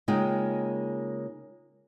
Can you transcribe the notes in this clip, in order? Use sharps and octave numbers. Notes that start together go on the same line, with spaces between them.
C#3 G#3 A#3 D#4 F4 G5